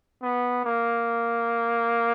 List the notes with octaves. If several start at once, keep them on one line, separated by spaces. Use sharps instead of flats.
B3
A#3